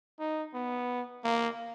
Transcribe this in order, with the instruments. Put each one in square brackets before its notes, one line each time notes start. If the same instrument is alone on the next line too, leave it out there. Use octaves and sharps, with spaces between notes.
[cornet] D#4
B3
A#3